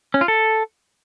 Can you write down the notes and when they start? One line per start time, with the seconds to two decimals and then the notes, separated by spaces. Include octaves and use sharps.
0.14 C#4
0.21 F4
0.28 A4